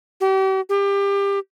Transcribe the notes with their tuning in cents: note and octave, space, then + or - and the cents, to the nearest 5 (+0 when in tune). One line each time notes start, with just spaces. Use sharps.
G4 -40
G4 +25